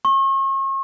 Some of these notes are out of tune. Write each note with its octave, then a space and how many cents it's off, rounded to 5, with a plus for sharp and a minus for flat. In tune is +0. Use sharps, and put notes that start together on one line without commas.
C#6 -40